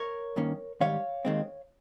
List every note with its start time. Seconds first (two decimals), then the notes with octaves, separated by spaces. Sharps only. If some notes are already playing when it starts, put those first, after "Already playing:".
Already playing: A#4 C#5
0.36 G2 D#3 A#3 C#4
0.81 G#2 D#3 G3 C#5 F5
1.25 D#2 D#3 G#3 C4